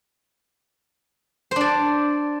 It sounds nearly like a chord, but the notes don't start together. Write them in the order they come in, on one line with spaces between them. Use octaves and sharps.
C5 D4 D5